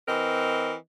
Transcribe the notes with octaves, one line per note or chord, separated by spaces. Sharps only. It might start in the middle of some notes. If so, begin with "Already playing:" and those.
E3 C4 A#4 D#5